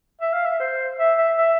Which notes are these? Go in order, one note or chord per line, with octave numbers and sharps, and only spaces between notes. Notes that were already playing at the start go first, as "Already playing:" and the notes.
E5
F5
E5
C5
E5
E5
E5